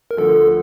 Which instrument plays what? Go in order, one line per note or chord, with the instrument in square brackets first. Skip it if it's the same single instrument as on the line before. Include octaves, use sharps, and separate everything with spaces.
[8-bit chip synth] A#4
[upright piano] D2 D3 F3 [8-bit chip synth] A4